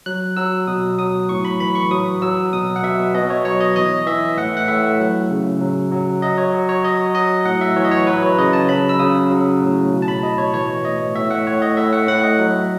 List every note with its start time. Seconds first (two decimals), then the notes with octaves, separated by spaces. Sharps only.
0.06 F#3 F#6
0.37 F#3 E6
0.67 B2 D#6
0.98 F#3 D#6
1.29 A2 C#6
1.45 B5
1.60 E3 B5
1.75 C#6
1.91 F#3 D#6
2.22 F#3 E6
2.53 B2 D#6
2.76 F#5
2.83 B2 E5
3.14 B2 D#5
3.30 C#5
3.45 F#3 C#5
3.60 D#5
3.76 E3 D#5
4.07 E3 E5
4.37 A2 F#5
4.57 F#5
4.68 A2 E5
4.99 F#3
5.30 C#3
5.61 F#3
5.92 F#3
6.22 F#3 D#5
6.38 C#5
6.53 F#3
6.69 C#5
6.84 F#3 D#5
7.15 F#3 D#5
7.45 A2 F#5
7.61 E5
7.76 E3 C#5
7.85 D#5
7.91 C#5
8.07 F#3 B4
8.23 C#5
8.38 C#3 D#5
8.53 A5
8.69 F#3 B5
8.89 E6
8.99 C#3 D#6
9.31 F#3
9.61 A2
9.92 B2
10.02 A5
10.08 B5
10.23 B2 D#5
10.38 C#5
10.54 E3 C#5
10.85 A2 D#5
11.15 A2 E5
11.31 F#5
11.46 A2 C#5
11.62 D#5
11.77 A2 E5
11.93 F#5
12.08 A2 F#5
12.23 D#5
12.39 F#3